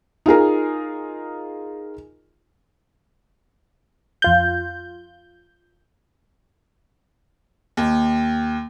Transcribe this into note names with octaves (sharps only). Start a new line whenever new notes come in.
D#4 F4 G#4 A#4
F2 F4 G6
D#2